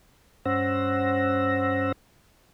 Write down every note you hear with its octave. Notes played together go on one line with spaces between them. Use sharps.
G2 C#4 C5 F#5 E6 A#6